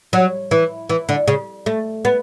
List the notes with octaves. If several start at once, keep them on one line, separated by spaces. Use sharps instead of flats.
F#3
E3
E3
D3
C#3
A3
B3